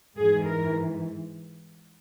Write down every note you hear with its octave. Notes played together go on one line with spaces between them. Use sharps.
G#2 E3 G#4
A#4